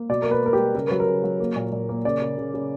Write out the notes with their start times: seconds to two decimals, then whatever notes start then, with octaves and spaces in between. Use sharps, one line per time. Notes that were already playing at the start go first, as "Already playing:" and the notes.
Already playing: A#3
0.09 B2 D5
0.22 A#3 A#4
0.31 B4
0.42 A#3 A#4
0.53 G4
0.58 G3
0.75 C#3 A#4
0.87 F#3 B4
1.00 A#4
1.07 C#3
1.24 F#3
1.40 A#3
1.56 A#2
1.72 A#2
1.89 A#3
2.05 C#3 D5
2.21 C#3
2.38 C#3
2.54 C#3